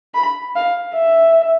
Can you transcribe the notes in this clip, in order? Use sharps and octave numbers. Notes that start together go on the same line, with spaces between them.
B5
F5
E5